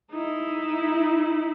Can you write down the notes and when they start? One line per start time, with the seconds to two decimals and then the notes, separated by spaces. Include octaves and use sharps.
0.12 D#4 E4